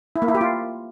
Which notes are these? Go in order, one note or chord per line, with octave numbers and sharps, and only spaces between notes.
E4
A#3
E4
G4
F4